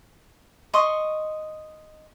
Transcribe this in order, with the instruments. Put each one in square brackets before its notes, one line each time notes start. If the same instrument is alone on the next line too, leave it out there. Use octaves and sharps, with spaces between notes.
[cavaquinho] D#5 C6 C#6